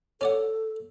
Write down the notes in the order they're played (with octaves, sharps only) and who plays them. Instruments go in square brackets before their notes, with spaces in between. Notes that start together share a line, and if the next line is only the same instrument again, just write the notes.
[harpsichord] C#4 D5 F#5 [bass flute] A4